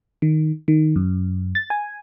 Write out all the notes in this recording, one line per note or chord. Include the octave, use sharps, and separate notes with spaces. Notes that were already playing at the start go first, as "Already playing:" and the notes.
D#3
D#3
F#2
A6
G#5